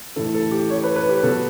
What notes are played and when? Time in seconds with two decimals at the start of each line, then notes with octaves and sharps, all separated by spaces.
0.16 A2 E3 A4
0.34 A4
0.51 G4
0.70 C#5
0.83 B4
0.96 B4
1.09 G4
1.23 B2 F#3 A4